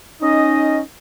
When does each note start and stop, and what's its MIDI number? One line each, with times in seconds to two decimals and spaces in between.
0.21 0.78 61
0.21 0.78 63
0.21 0.78 75